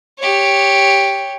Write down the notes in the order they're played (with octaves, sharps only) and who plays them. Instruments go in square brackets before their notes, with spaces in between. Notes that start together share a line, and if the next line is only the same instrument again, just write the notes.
[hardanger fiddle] G4 C#5